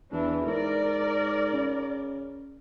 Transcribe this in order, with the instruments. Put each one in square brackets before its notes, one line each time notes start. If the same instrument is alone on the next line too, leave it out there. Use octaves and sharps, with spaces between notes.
[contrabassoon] E2 [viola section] E3 D4
[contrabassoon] G#2 [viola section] A#4 D5
[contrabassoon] C#3